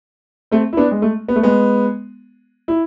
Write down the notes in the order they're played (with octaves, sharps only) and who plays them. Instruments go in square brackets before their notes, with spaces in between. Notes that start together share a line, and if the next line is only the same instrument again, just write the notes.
[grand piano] A3 C4
E4
B3 D4
G#3
A3
B3
A3
G#3 B3
E4